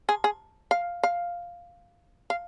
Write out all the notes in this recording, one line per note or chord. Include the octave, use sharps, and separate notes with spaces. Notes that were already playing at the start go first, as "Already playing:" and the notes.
G#4
G#4
F5
F5
F5